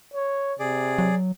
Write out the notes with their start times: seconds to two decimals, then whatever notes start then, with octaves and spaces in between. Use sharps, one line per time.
0.14 C#5
0.59 C3 G#4 D5
0.98 F#3